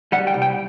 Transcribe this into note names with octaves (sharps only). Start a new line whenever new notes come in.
G3 F#5
G5
C2
G5